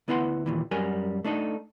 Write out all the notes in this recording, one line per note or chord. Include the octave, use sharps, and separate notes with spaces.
D2 B3 E4 B4 F#5 C6
D#2 A#2 E3
F#2 G3 A#4 G#5
A3 D4 D#4 A4